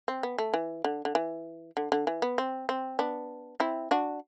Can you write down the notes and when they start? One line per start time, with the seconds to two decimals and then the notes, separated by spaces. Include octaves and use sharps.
0.08 C4
0.23 B3
0.38 A3
0.54 E3
0.84 D3
1.05 D3
1.15 E3
1.77 D3
1.92 D3
2.07 E3
2.22 B3
2.38 C4
2.69 C4
2.99 B3 D4
3.60 C4 E4
3.91 D4 F#4